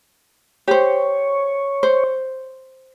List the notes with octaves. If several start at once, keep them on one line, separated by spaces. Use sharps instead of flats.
G4 C5 C#5
C5